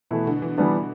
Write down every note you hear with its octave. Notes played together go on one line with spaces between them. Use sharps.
B2 E3 A3 E4
D3
E3
D3 E3 G3 B3 D4